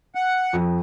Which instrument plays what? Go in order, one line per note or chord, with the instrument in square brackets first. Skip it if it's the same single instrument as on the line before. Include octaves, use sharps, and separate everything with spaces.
[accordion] F#5
[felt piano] F2